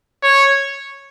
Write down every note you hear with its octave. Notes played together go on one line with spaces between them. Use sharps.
C#5